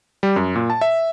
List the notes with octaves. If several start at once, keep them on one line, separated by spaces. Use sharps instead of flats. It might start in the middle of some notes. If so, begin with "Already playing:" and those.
G3
F#2
A#2
A5
E5